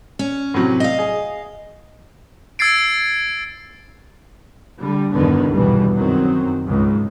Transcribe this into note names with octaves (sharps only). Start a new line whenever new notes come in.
C#4
A2 C3 F#3
D#5 F5
G#4
E6 G#6 A6 C7 D7
D3 G3
E2 G2 B2 D3 D#3 B3
B1 E2 G2 B2 E3 G3
F#2 D#3 F#3 C4
C#2 G#2